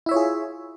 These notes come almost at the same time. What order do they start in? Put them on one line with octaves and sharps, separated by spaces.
E4 E5 C#5 F4 G#4